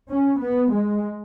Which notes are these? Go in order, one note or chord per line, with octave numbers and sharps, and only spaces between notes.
C#4
B3
G#3